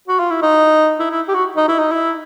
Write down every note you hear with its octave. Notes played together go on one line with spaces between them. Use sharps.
F#4
F4
E4
D#4
E4
E4
G4
F#4
D#4
E4
D#4
E4